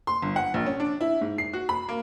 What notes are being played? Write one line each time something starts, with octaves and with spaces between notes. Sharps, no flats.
C6
G1
F#5
A#1
C#4
D4
E4
G#2
C7
F#4
B5
A#3